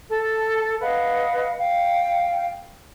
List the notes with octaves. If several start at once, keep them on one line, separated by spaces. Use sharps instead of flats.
A4 A5
B4 D#5 F5 F#5
F5 G5